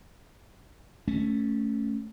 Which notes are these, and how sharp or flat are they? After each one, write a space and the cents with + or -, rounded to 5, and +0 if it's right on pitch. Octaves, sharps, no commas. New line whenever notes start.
A3 +0 C#4 +0